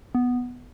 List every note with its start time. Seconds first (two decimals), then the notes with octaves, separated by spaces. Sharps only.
0.15 B3